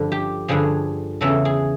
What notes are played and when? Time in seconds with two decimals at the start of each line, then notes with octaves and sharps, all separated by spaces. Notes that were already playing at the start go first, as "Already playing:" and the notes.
Already playing: G2 D3 F3
0.12 G4
0.48 G2 D3 F3 G#4
1.21 E2 C#3 E3 A4
1.45 G#4